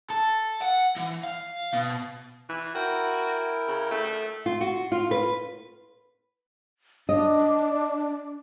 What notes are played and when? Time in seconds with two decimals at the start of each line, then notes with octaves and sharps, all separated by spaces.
0.10 A4
0.62 F#5
0.96 E3
1.24 F5
1.73 B2
2.49 E3
2.75 E4 F#4 A#4 G5
3.68 C#3
3.91 A3
4.46 F4
4.61 F#4
4.92 F4
5.11 B4
7.09 D4 D#5